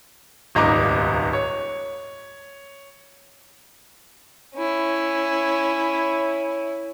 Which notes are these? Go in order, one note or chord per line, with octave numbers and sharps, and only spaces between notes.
D#1 G#1 C#2 D#5 A#5 D6
C#5
C#4 E4